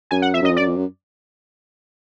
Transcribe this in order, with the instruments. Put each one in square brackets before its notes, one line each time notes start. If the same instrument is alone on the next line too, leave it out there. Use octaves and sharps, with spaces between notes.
[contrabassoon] F#2 [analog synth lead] G#5
[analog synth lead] F#5
[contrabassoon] F2 [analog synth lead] E5
[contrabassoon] F#2 [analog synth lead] D#5
[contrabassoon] F2
[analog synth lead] D5
[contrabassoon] F#2
F2
F#2